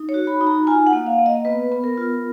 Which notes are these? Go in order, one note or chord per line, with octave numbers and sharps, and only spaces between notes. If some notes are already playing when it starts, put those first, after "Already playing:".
Already playing: D#4
C#5
F#4
B5
D#4
A#5
F4 G#5
F#5
A#3
F5
A#3
D#5
B3 B4
B3
A#4
F4